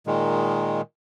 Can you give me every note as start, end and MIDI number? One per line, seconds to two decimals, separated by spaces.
0.07 0.81 46
0.07 0.81 51
0.07 0.81 56